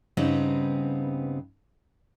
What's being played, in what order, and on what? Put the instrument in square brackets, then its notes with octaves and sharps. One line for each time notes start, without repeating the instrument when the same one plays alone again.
[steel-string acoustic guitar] G2 C#3 G3 B3 C4 D#4